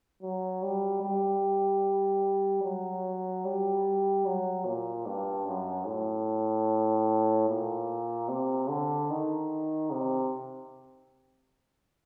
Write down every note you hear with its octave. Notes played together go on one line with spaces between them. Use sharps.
F#3
G3
G3
F#3
G3
F#3
A#2
G2
F#2
A2
A#2
C3
D3
D#3
C3